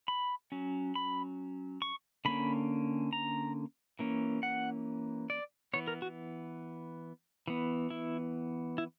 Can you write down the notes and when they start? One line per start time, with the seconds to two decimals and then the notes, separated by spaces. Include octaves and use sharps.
0.08 B5
0.52 F#3 C#4
0.95 B5
1.82 C#6
2.25 D3 A#3 C#4 B5
3.13 A#5
3.99 E3 A#3 C#4
4.43 F#5
5.30 D5
5.73 E3 B3 C#5
5.88 A#4
6.02 F#4
7.47 E3 B3
7.90 E4
8.78 E4